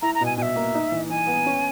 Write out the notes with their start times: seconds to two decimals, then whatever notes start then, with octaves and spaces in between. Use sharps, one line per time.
0.02 E4 A#5
0.15 A#5
0.21 B2 G#5
0.38 B2 E5 G#5
0.56 A#3
0.75 D#4
0.92 E3
1.10 E3 G#5
1.27 B3
1.46 C#4